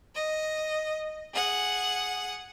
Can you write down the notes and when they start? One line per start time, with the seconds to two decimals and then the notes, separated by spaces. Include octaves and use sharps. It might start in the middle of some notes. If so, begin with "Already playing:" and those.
0.15 D#5
1.33 G#4 F#5